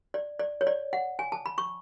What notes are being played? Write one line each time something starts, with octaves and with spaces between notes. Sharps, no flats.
D5
D5
C#5
D5
F#5
G#5
A5
B5
C#6